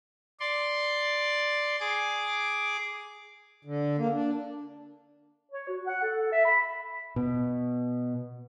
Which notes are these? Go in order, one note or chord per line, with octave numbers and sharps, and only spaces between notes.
D5 C6
G#4 D6
D3
A#3
D4
C#5
F#4
F#5
A4
E5
B5
B2